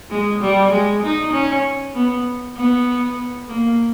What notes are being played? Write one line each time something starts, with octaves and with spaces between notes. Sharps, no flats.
G#3
G3
G#3
D#4
C#4
B3
B3
A#3